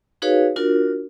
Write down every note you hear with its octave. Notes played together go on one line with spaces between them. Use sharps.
D#4 F#4 G#4 B4 C#5 F5
D4 F4 F#4 A#4